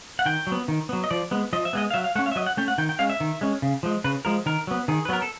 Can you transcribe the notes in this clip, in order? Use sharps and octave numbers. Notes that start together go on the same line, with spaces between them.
F#5
D#3 G5
F#3
B3
D#3
F#3 B3
D#5
F3 D5
G#3 B3
F3 D#5
E5
G#3 B3 D#5
F5
F#3 E5
F5
A3 C#4 F#5
F5
E5
F#3 D#5
F#5
A3 C#4 G5
F#5
D#3 G5
G5
G#3 C#4 F5
E5
D#3
G#3 C#4
C#3
F3 G#3
C#3 B4
F3 G#3 A#4
D#3 A#4
F#3 B3
D#3 G#4
B4
F#3 B3 A#4
A4